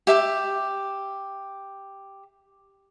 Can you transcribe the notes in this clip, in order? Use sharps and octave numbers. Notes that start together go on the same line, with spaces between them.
G4 E5 D6